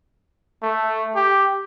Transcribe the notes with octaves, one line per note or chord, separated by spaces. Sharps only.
A3
G4